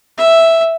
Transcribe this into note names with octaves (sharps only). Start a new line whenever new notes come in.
E5